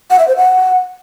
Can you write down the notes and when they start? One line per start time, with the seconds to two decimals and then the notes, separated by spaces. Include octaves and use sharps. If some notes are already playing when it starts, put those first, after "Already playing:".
0.10 F#5
0.19 E5
0.28 C5
0.36 F#5